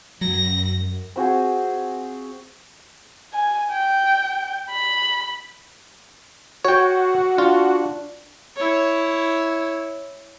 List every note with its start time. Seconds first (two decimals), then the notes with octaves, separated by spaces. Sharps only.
0.21 F#2 F#3 A#6
1.16 C4 F#4 G#4
3.33 G#5
3.72 G5
4.71 B5
6.65 F#4 C#5 G5
7.38 D4 F4
8.56 E4 C#5